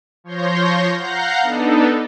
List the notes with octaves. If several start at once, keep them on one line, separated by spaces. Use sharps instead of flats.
F3 C#5 C6 G6 A#6
F5 F#5 A#5 G6 A#6 C7
B3 D4 D#4 A4